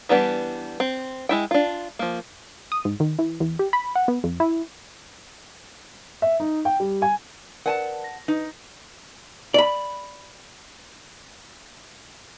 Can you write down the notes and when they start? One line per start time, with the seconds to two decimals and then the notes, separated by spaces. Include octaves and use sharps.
0.09 E3 G3 B3 D4
0.80 C4
1.29 G#3 E4 G5
1.51 D4 F4
1.99 F3 A#3
2.72 D#6
2.85 G#2
3.00 D#3
3.19 E3
3.40 E2
3.59 G4
3.73 B5
3.96 F#5
4.08 B3
4.24 F2
4.40 E4
6.22 E5
6.40 D#4
6.65 G5
6.80 G3
7.02 G#5
7.66 A#4 B4 D5 F#5 G#5 A5
8.04 A#6
8.28 D#4 B4 D#5
9.54 D5 B5